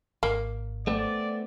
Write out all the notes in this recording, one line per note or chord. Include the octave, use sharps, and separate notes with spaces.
G#1 A#3
A3 B3 C4 D5